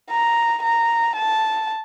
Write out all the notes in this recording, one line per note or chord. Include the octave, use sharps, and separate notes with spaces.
A#5
A#5
A5